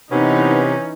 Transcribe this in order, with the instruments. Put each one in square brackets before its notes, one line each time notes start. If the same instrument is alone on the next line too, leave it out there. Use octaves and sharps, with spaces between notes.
[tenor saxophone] C3 [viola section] E3 D#4 [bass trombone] B3 [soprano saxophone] C#4